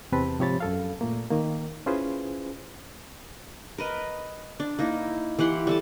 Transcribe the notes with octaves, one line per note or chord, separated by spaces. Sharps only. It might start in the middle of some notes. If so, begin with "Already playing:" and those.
E2 C3 C4 B4 A5 B5
G#2 C3 F3 C#5 B5 A6
F#2 A4 F5
A#2 A3 A#3
D#3 A#3
C#4 E4 F4 G#4 B4 C5
A#4 B4 D#5
D4
A#3 D#4 E4
E3 G4 F#5 C6
G3 A4 A5